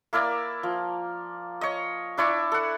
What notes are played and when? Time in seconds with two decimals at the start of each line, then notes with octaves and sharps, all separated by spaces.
0.13 A#3 E4 A#4 D5
0.63 F3
1.61 C#5 D#5
2.17 D4 E4 D5 C#6
2.52 A4 F#5